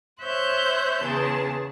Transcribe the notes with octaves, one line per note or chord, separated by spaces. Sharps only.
C5 C#5 E5 F#6 G6
E2 C#3 G#4 A5